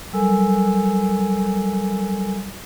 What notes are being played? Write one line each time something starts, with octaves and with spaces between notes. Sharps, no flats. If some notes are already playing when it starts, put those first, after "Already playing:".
F#3 G3 A4 A#4 G#5 E6